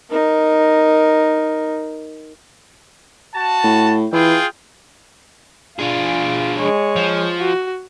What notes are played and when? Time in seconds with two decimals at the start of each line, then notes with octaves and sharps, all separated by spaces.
0.10 D#4 A#4
3.35 F#4 A5
3.64 A2
4.13 E3 F4 G#4 G5
5.79 D4 F4 G#4
6.59 G#3 C#5
6.96 F3
7.41 F#4